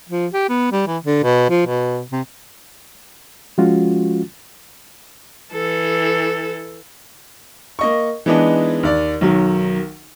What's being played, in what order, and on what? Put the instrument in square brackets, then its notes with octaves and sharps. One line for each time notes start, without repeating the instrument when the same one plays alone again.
[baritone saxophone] F3
G4
B3
G3
E3
D3
B2
F3
B2
C3
[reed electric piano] F3 G#3 C#4 F4 F#4
[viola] E3 A4
[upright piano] A#3 D#5 C#6
E3 G#3 B3 D4 D#4
D#2 D5
B1 D#3 F#3